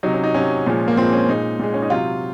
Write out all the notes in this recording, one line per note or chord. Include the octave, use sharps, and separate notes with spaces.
C3 F#3 D#4
C#4
D#4
C3 F#3 C#4
A#2 F3 G#3
A#3
A#2 F3 G#3 C4
C#4
A#2 G#3 D#4
A#2 G#3
C#4
D#4
C3 F#3 F4